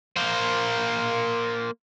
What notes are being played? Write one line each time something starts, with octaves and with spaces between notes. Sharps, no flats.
A#3 C5